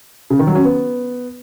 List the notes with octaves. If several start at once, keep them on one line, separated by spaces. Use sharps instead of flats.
C#3
D#3
F#3
C#4
B3